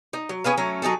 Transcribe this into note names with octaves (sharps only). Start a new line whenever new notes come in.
D#4
F#3
C#4 G#4 B4 F5
F#3 A3 C#4
F#3 D#4 G#4 A4